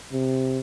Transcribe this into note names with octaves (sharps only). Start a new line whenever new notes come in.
C3